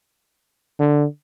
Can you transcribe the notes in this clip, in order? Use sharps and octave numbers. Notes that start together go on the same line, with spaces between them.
D3